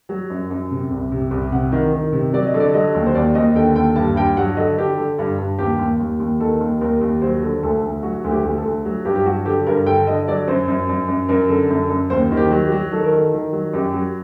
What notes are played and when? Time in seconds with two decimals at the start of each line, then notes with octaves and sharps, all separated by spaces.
0.09 F#3
0.30 F#2
0.51 F#2
0.71 C3
0.91 C2
1.12 C3
1.31 C2
1.52 C3 F#5
1.72 D#3
1.93 D#3
2.13 C3
2.33 F#3 D5
2.47 D#5
2.54 D3
2.60 D5
2.74 F#3 D#5
2.95 D#2
3.06 C5
3.15 D#2 D5
3.35 D#2 D#5
3.55 D3 G5
3.75 D#2 G5
3.96 G2 A5
4.16 G2 G5
4.37 F#3 F#5
4.57 D3 D#5
4.78 D3 G4
4.98 D3
5.19 G2
5.38 G2
5.59 D#2 G4
5.79 D#2
6.00 D#2
6.20 D#2
6.40 D#3 A4
6.60 D#2
6.81 D#2 A#4
7.01 D#2
7.22 F#3 C5
7.43 D3
7.63 D2 A4
7.83 D2
8.03 F#3 F#4
8.24 D2
8.31 G4
8.44 D2
8.58 A4
8.65 D2
8.85 F#3
9.05 G2 G4
9.15 G4
9.26 F#3 F#4
9.46 D3 G4
9.67 G2 A#4
9.86 D3 G5
10.07 D3 D#5
10.28 F#3 D5
10.48 F#2 C5
10.68 F#2
10.89 F#2
11.08 F#2
11.29 F#2 A#4
11.49 D3
11.70 F#2
11.90 F#2
12.10 D#2 C5
12.31 D#3
12.37 G4
12.51 F#3
12.64 G4
12.72 F#3
12.92 D#3 A4
13.04 A#4
13.12 D#3 A4
13.33 D#3
13.53 F#3
13.74 F#2 G4
13.93 F#3